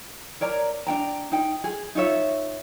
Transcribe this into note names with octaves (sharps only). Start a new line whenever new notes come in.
A#4 C#5 D5 A#5
D4 D#4 G5 A#5
D#4 G5
G#4
D#4 F4 C#5 E5